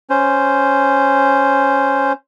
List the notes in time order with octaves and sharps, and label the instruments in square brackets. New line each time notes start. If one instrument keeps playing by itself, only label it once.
[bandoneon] C#4 C5